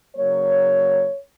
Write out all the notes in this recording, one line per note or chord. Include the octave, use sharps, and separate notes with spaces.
C#3 F#3 A#3 C#5